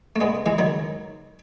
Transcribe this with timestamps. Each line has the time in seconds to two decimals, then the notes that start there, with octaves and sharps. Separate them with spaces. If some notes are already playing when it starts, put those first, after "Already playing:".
0.16 A3
0.21 G#3 B3
0.46 E3 G#3
0.58 D#3 F#3